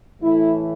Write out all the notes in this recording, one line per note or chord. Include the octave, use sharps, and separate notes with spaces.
A2 E3 A3 E4